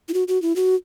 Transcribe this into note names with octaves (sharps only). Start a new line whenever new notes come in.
E4
F#4
F#4
E4
F#4